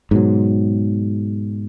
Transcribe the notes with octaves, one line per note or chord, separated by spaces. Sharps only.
G#2 B2 F#3